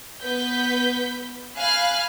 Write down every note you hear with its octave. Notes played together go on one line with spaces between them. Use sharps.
B3 B4 G6 B6
F5 G#5 B5 F6 F#6